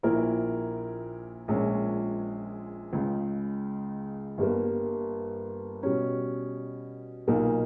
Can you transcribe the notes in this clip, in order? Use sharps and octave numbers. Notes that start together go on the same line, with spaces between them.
A#1 A#2 A#3 E4 A#4
A#1 A#2 G#3 C#4
C#2 C#3 G#3
G1 G2 G3 A#3
B2 G3 C#4
B1 A#2 A#3 D#4